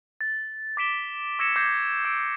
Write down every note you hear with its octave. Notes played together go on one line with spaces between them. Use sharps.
A6
D6 A6 B6 D7 E7 G7
C#6 E6 G#6 A#6 C#7 E7
D6 G6 G#6 A#6 C7 E7
E6 D7